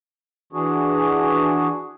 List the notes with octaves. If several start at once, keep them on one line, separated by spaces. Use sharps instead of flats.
E3 D4 F#4 G#4